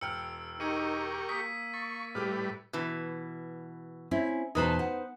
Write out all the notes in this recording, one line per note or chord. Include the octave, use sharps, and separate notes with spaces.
E1 G5 E6 F6 C#7
D#4 G4 A#4 C#6 G#6 C#7 D#7
A#3 D#6 B6
C#6 A6
A2 G3 G4 B4 D6 F6
B2 E3
C4 C#4 E4
E2 B2 D#4 B4 C5 A5
F#5